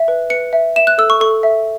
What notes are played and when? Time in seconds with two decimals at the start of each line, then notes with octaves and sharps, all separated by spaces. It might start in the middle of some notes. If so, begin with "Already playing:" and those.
Already playing: E5
0.08 B4
0.30 B4 C#7
0.53 E5
0.76 E5 E7
0.87 F#6
0.98 A4 E6
1.10 C#6
1.20 A4 C#6
1.43 E5